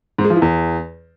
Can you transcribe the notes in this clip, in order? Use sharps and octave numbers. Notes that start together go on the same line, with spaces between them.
G#2
G#3
F3
E3
E2